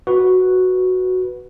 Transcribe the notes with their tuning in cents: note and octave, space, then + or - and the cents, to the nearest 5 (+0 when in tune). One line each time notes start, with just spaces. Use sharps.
F#4 +0 B4 -5